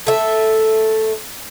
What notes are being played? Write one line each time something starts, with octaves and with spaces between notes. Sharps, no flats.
A3 E5